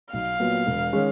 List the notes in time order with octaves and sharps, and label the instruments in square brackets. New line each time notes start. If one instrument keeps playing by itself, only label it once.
[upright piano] B1 [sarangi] F5
[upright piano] A#2 F#3 B3
E1
D#3 G#3 C#4